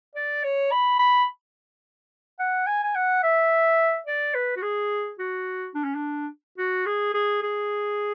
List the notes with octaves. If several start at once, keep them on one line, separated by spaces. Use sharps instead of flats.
D5
C#5
B5
B5
F#5
G#5
G#5
F#5
E5
D5
B4
F#4
G#4
F#4
D4
C#4
D4
F#4
G#4
G#4
G#4